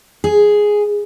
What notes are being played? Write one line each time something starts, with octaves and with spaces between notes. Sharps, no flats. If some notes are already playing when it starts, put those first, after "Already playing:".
G#4